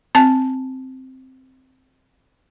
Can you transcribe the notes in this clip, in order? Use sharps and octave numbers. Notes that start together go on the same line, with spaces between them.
C4 A5